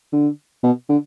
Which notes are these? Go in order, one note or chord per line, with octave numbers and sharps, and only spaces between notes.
D3
B2
D3